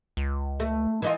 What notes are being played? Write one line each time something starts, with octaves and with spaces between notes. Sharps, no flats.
C#2
A3
E3 D#4 F4